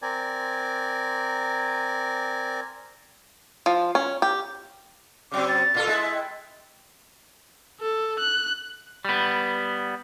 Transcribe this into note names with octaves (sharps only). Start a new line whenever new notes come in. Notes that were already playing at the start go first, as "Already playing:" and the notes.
C4 A#4 D5 G#5
F3
C#4
G4
C#3 F#3 C4 D6
A6
A#2 F4 A4
G#3 E4
G5
A4
F#6
G3 B3